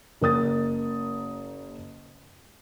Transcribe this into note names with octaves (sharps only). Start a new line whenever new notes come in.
F#1 A#4 D#6 A6